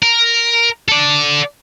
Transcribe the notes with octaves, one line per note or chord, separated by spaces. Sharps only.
A#4
A4 D5